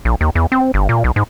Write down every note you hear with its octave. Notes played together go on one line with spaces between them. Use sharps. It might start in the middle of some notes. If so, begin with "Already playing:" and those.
A#1
D#2
E2
C4
G1
A#2
B1
G#2